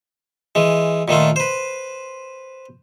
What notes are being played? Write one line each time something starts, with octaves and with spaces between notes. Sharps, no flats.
E3 G#3
A#2 D#3 A3 F4
B4 C5